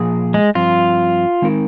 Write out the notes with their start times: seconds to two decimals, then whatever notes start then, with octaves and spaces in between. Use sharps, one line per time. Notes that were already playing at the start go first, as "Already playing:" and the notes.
Already playing: A#2 F3 G#4
0.34 G#3
0.55 G2 F3 C4 F4
1.42 D#3 G#3 C4 D#4 A#4